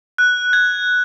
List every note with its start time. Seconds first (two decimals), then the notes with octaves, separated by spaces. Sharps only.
0.18 F#6
0.53 G#6